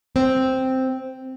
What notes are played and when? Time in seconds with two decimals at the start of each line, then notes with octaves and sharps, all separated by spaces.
0.16 C4